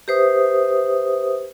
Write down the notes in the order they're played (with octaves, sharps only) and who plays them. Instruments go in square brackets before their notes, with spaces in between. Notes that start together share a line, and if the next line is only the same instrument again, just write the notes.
[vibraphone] G4 B4 C5 E5 D#6